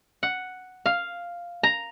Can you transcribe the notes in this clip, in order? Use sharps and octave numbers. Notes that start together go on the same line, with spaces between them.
F#5
F5
A#5